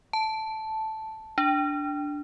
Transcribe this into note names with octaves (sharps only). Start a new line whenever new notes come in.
A5
D4